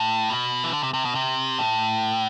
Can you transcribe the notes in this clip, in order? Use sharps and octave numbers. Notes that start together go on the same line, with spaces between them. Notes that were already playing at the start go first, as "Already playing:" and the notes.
Already playing: A2
B2
E3
D3
C3
C3
B2
C3
A2